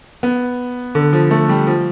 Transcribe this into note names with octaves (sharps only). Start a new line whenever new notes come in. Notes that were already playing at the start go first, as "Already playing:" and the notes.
B3
D3
F3
A3
G3
F3